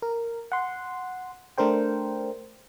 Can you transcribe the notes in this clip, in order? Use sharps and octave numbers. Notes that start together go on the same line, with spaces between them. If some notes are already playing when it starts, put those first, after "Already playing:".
A#4
F#5 C6
A3 D4 A#4 C5 G5